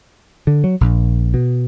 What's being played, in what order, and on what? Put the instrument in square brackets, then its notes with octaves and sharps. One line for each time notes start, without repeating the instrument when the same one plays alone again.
[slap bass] D3
F#3
A#1
B2